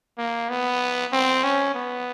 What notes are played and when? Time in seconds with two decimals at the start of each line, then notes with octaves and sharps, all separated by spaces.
0.18 A#3
0.49 B3
1.13 C4
1.44 C#4
1.74 B3